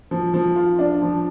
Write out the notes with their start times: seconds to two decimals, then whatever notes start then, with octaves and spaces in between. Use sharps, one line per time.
0.11 F3
0.34 F3
0.56 F4
0.79 D4
1.02 F3